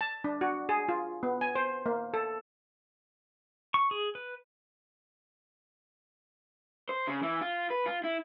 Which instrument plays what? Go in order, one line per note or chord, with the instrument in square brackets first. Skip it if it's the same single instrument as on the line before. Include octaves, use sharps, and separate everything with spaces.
[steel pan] A5
D4
F#4
G#4
F4
B3
G#5
C5
A#3
A4
[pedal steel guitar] C#6
G#4
B4
[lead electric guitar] C5
C#3
E3
F4
B4
F4
E4